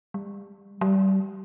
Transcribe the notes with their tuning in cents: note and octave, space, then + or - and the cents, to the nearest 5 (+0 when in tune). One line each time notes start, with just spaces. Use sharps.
G3 +30
G3 -25